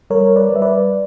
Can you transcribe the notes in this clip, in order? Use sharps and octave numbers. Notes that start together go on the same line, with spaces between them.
G3 A#4 C#5
B4 D5
G3
E5
B4 D5